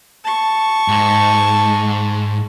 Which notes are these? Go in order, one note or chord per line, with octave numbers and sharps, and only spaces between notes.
A5 C#6
G#2